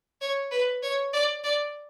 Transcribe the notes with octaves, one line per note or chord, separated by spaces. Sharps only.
C#5
B4
C#5
D5
D5